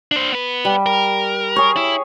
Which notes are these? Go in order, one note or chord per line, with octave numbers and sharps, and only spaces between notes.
D4 C5
B3 B4
G3
A#4
G#4 C#5
E4